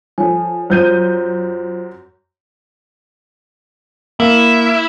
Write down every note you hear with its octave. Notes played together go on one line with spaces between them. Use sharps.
F3 A4 C#5 G#5
F#2 F4 C5 G6 D#7
A#3 E4